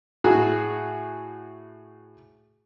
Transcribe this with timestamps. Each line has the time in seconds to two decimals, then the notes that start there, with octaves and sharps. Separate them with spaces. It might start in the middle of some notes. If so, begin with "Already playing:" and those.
0.24 A2 F#4 G#4